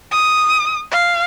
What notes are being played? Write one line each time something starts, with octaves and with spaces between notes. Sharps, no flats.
D#6
F5